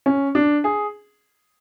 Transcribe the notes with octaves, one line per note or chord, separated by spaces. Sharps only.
C#4
D4
G#4